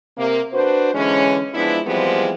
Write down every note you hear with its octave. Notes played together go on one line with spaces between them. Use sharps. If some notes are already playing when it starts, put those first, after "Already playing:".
C3 A#3
D4 F#4 B4 C5
D3 E3 G#3 C#4
F3 G#3 B3 D4 E4
E3 F3 G3 G#3 B3 C4